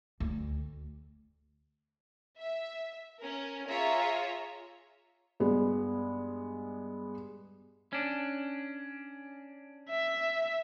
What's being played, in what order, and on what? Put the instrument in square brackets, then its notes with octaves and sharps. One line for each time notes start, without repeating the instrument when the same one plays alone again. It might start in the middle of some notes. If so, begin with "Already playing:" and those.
[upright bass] D2
[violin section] E5
C#4 A#4
F4 G#4 C#5 E5 A#5
[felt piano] G2 G#3 B3
[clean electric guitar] C#4 D4
[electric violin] E5